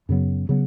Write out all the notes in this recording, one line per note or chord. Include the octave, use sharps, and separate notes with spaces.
F#2 C#3 F#3 B3
C#3 F#3 B3